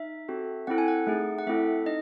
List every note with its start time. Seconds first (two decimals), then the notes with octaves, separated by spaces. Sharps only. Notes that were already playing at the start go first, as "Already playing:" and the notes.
Already playing: D#4 E5
0.28 C4 F#4 A4
0.67 C4 E4 A4 F#5
0.78 G#5
0.88 F#5
1.07 A3 D#4 G#4
1.38 F#5
1.47 A3 C4 E4 A4 E5
1.86 D#4 D#5